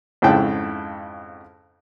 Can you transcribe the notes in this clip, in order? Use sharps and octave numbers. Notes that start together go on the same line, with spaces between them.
F2 G#2 C#3 E4 G5 A5